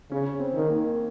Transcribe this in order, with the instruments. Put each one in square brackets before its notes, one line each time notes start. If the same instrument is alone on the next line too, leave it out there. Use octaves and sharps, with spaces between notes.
[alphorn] C#3 [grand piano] C#4
[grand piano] C4
[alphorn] D#3
[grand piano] A#3